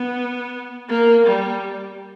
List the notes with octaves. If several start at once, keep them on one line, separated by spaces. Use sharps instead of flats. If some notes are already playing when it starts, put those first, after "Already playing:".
Already playing: B3
A#3
G3